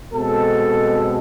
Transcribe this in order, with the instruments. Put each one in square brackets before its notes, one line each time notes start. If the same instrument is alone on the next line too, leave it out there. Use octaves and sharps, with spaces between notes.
[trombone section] B2 G#3 C4 A4